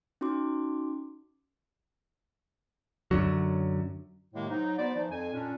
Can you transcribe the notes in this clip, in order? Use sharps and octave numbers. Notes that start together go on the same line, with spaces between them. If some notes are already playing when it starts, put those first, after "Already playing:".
C#4 D#4 F#4 C6 D6
F#2 D3 F#3
A2 C3 D#3 G#3 A#3
G#2 F#3 D#4
B3 F#4 C5 D5
E3 F3 D#4
F2 G#5
A#2 C#4 D4